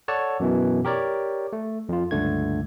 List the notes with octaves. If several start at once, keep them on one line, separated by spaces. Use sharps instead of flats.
A4 C#5 D5 F#5 A5
F#2 B2 E3
G4 A#4 C#5 D5
A3
F2 F4
C#2 G2 D3 A3 G#6